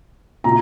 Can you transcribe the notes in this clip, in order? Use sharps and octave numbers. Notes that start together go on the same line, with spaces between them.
A#2 A#5